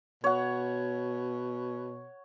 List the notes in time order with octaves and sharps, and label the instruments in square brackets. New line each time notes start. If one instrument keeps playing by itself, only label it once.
[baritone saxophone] B2 [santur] C#5 F#5